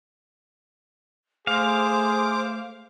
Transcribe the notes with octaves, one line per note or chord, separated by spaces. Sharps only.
A3 G#4 C5 F5 D6